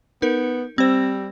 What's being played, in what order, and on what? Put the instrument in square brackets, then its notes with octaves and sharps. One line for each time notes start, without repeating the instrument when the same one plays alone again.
[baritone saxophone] B3 [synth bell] D#4 A#4
[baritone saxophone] G3 [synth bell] C4 C5